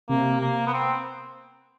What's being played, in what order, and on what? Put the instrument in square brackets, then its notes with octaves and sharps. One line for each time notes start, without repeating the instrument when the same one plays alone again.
[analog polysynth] C3 [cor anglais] A#3
[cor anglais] A#3
B3
C4